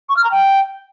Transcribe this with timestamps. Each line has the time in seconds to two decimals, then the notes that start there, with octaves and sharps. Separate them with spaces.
0.09 C#6
0.17 F6
0.24 A#5
0.31 G5